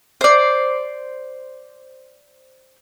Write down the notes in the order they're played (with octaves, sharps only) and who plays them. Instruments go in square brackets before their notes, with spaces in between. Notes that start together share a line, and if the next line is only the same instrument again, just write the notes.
[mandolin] C5 D5